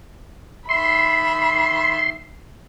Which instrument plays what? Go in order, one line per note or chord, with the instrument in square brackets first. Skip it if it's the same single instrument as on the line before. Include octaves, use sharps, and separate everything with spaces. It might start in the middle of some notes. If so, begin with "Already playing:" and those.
[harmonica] D#3 E5 [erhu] B5 [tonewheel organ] C6